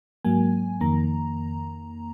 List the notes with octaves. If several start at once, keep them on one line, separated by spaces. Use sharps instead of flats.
G#2 F#3 A#3 G#5
F2 D#3 A#3 A#5